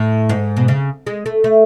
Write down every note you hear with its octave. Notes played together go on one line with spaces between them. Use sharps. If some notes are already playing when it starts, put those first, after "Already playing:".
Already playing: A2
G#2
B2
C#3
G#3
A3
A3